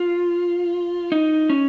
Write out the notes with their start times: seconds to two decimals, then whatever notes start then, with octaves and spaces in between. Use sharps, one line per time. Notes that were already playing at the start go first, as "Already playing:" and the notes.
Already playing: F4
1.12 D#4
1.50 C#4